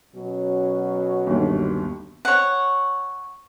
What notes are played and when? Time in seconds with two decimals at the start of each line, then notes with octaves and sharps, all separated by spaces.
0.14 B2 F#3 C#4
1.26 G1 D#2
2.25 C#5 F#5